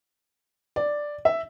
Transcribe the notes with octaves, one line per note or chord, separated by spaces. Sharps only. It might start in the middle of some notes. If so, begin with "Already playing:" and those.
D5
E5